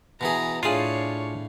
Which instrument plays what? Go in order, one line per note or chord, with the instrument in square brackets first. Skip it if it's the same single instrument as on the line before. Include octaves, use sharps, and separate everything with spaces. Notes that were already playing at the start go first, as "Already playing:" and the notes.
[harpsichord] B2 E3 G#4 [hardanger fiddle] A#5
[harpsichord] A2 F5 [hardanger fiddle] D4 C#5 [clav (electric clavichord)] F4 G#4